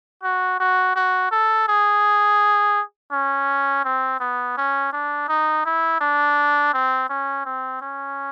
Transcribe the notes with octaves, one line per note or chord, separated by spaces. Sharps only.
F#4
F#4
F#4
A4
G#4
C#4
C4
B3
C#4
D4
D#4
E4
D4
C4
C#4
C4
C#4